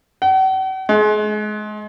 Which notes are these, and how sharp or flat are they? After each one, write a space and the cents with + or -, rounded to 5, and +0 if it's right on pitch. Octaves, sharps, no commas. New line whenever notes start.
F#5 +45
G#3 +30